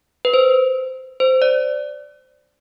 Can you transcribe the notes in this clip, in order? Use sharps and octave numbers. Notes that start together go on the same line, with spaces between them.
B4
C5
C5
D5